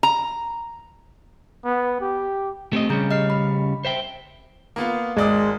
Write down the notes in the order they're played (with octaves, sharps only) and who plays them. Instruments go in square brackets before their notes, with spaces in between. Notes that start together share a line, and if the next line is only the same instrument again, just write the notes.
[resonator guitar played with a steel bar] A#5
[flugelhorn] B3
G4
[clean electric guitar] A3 C4 D#5 [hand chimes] G4
[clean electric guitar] C#3 G3 C#4 [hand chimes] G#4 A#5 G6
[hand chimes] D#5 F6 C7
B5
[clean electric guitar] C5 E5 G5
[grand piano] A#3 B3 F4
[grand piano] G#1 D5 D#6 [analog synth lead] G#3